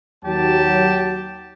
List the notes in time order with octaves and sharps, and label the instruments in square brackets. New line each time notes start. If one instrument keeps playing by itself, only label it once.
[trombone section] D#2 F#3 [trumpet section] G4 A5